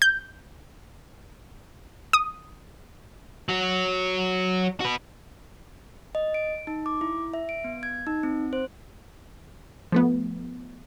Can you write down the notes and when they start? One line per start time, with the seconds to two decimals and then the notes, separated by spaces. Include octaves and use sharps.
0.02 G6
2.13 D#6
3.49 F#3 F#4
4.80 F#4 B4
6.15 D#5
6.34 D7
6.67 D#4
6.86 D6
7.01 E4
7.34 E5
7.49 D7
7.64 B3
7.83 G#6
8.07 D#4
8.23 C4
8.53 C5
9.92 F3 A3 B3